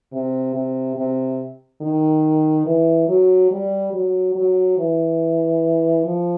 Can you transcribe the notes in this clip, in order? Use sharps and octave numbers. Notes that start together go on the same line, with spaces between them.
C3
C3
C3
D#3
E3
F#3
G3
F#3
F#3
E3
F3